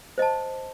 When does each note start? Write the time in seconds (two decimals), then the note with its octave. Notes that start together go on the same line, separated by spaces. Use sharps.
0.18 C5 D#5 A5